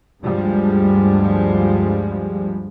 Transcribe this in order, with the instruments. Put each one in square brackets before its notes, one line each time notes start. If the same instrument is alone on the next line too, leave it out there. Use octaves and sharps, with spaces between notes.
[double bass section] D2 G2 F3 G3 G#3